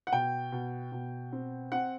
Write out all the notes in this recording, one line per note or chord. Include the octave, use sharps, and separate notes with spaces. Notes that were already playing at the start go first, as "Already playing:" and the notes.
F#5
B2 G5
B2
B2
C4
C4 F#5